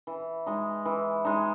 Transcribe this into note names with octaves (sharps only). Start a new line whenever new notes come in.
E3
G#3 D#4
E3
G#3 D#4